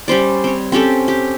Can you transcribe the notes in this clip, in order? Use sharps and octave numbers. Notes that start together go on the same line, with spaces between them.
G3 C#4 C5 D5
C4 C#5
C4 C#4 G4 A4
G4